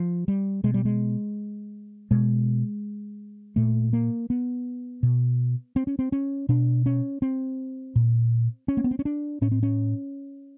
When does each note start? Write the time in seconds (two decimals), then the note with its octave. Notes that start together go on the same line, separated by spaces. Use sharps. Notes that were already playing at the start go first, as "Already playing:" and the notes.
Already playing: F3
0.28 G3
0.64 B2 G#3
0.74 G3
0.85 G#3
2.11 B2 G#3
3.56 A#2 A3
3.93 A#3
4.30 B3
5.03 B2
5.76 C4
5.87 C#4
5.99 C4
6.12 C#4
6.49 B2 D4
6.86 C#4
7.22 C4
7.96 A#2
8.68 C#4
8.77 A#3
8.84 B3
8.91 C4
8.99 C#4
9.05 D4
9.42 A2 C#4
9.52 C4
9.63 C#4